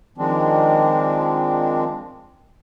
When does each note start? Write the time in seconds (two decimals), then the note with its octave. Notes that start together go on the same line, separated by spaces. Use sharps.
0.18 D#3 F3 G#3 C4 D4